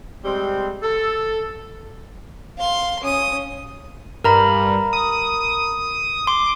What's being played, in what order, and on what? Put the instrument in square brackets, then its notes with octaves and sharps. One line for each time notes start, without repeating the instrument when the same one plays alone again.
[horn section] G3 G#3 C4
A4
[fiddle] F5 C6
C#4 D#6
[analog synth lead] G2 [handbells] A#4 A#5 B5
[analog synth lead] D#6
[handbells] C6 [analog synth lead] D6